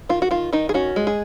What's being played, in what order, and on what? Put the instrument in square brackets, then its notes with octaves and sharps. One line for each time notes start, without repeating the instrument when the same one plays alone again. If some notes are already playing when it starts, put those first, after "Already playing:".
[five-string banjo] D#3 F4
F#4
D#3 F4
D#3 D#4
G#4
C#4 F#4
G#3
G#4